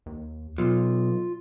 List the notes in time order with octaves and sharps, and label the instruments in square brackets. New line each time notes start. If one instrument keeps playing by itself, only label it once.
[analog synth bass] D#2
[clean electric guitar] B1 [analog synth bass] F4